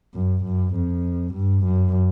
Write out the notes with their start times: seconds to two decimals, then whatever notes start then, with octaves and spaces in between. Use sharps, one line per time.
0.14 F#2
0.44 F#2
0.75 F2
1.34 G2
1.64 F#2